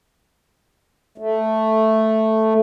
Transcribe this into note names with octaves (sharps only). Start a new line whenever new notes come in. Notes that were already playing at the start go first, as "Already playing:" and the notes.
A3